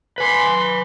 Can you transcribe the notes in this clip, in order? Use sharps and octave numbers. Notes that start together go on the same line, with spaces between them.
B4 G#5 B5 C6